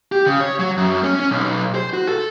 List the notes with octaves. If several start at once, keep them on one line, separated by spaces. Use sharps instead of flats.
G4
C#3
C#5
F#3
F#2
C#4
C#4
B1
C5
F#4
A4